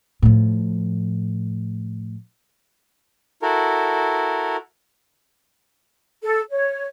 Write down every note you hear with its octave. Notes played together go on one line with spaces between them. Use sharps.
A2 F3
E4 F#4 A4 A#4
A4
C#5